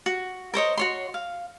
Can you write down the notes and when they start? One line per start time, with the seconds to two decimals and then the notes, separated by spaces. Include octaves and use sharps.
0.06 F#4
0.54 A#4 C5 C#5 D#5
0.77 F#4 C#5 C6
1.14 F5